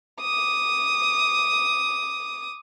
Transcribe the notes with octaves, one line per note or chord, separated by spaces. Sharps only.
D6 D#6